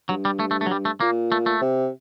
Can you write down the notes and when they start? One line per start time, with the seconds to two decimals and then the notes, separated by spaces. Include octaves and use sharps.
0.09 G2 F#3
0.25 G3
0.40 A3
0.51 A3
0.61 A3
0.66 F#3
0.71 G3
0.85 A3
1.00 A#2 A#3
1.32 A3
1.46 A3
1.61 C3